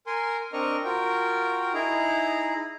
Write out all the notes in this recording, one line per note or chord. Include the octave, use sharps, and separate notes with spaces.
A#4 G#5 C6
C4 D4 A#4 D#5 C#6 F6
F4 F#4 A#4 G5
D#4 E4 G#4 A#5